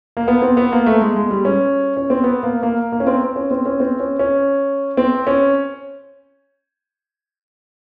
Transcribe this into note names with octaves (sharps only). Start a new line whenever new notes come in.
A#3
B3
C4
B3
A#3
A3
G#3
G#3
G3
C#4
C#4
C4
B3
A#3
A#3
A#3
C#4
C4
C#4
C4
C#4
C4
C#4
C#4
C4
C#4